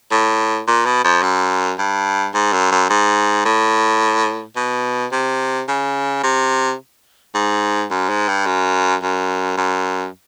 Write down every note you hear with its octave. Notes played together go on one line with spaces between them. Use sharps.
A2
A#2
B2
F2
F#2
G2
G#2
F#2
F#2
G#2
A2
B2
C3
C#3
C3
G#2
F#2
G#2
G2
F#2
F#2
F#2